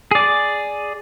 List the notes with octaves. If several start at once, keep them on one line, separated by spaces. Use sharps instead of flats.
G#4 D5